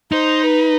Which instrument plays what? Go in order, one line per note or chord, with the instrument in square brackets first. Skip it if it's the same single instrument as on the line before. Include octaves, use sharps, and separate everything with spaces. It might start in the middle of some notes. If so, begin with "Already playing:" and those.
[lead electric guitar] D#4 [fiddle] C5
[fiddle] B4